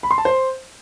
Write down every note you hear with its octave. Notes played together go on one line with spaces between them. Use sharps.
B5
C6
A5
C5